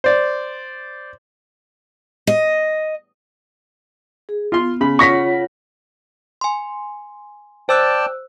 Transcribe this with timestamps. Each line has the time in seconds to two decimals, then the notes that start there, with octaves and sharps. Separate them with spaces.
0.04 C5 D5
2.27 D#5
4.29 G#4
4.52 B3 F4 C6
4.81 C#3 B5
4.99 F4 C#5 F#5 C#6 A#6 B6
6.41 G#5 C6
7.69 C5 D5 G5 A5 E6 F#6